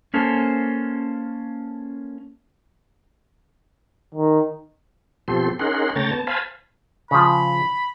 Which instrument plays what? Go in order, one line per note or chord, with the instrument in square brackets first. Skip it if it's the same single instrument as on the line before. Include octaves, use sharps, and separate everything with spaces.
[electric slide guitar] A#3 C#4 A4 C5
[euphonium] D#3
[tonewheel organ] B2 F3 C4 G4 A4 C6
C#4 D#4 G#4 A#4 F#5 C6
C#3 A3 C#5 G5 A#5 A6
B3 A5
C5 F5 G#5 A5 B5
[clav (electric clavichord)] C#3 F3 [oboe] B5